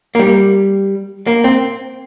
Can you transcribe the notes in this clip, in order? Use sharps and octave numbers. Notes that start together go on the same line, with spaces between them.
A#3
G3
A#3
C4